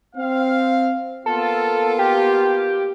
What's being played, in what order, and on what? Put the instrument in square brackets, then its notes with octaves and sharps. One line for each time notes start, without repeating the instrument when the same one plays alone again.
[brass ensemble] C4 F5
[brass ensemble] A#3 B3 F4 [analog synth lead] A4
[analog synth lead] G4